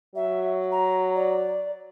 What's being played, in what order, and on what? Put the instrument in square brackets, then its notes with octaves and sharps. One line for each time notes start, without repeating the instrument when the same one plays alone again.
[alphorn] F#3 [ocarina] E5
[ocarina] A#5
D5